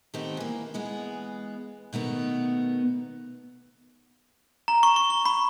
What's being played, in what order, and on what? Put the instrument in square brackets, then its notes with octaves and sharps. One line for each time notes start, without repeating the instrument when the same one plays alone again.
[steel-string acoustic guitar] D#3 A3 B3 C4 G4
E3 A#3
E3 G#3 B3
B2 D#3 A3 B3
[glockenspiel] A#5
C#6
C#6
G7
B5